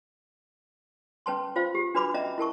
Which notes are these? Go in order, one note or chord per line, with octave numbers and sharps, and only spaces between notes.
C#4 B4 A5 C6
F4 C5 F5
G4
D4 F#4 B4 B5 D6
C#4 D#5 E5 A#5
E4 A#4 A5 C#6